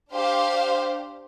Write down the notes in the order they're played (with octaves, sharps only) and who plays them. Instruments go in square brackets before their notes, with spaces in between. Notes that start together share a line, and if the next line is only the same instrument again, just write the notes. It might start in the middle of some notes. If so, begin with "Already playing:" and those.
[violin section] D4 G4 C5 F5